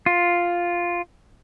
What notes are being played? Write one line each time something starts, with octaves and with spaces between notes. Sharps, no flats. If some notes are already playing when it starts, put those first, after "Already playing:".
F4